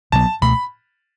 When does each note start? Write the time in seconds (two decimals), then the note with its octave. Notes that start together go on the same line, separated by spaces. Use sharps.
0.12 B1 B2 F#3 B3 A5
0.41 C#2 B2 A3 B5